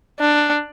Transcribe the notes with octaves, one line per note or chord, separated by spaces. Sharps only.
D4